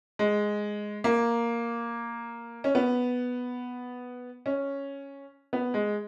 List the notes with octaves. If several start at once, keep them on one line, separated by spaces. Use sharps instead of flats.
G#3
A#3
C#4
B3
C#4
B3
G#3